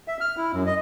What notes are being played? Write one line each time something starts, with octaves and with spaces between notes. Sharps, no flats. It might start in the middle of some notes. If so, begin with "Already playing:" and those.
E5
F6
E4
F#2
D#5